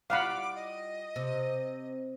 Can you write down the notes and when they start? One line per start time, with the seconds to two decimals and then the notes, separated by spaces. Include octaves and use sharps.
0.10 G3 E4 F4 F5 F#5 B5 D6
0.55 D#5
1.16 C3